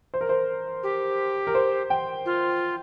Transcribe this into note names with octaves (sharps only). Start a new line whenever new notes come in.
C5
A#4
C5
G4
A#4
C5
G5
F4